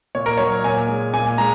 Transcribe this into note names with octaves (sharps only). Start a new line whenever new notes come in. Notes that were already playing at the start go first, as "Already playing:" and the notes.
A#2 C#5
A#4
F#3 C#5
A#2 G#5
G#3
A#2 G#5
G#3 A#5